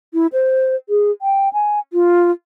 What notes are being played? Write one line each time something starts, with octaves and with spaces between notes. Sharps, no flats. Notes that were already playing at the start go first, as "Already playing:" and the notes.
E4
C5
G#4
G5
G#5
F4